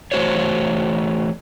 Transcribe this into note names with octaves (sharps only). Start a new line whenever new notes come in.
E3 A3 C4 F#4 C5 C#5